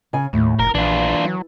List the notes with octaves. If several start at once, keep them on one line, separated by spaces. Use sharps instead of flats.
C#3 G#5
D#2 A2
F1 A#4
A#1 E3 D4 F4
F#3